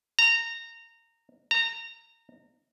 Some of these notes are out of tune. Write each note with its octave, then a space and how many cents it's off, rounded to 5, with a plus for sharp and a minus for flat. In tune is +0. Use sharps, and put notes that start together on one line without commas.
A#5 -20
A#5 -25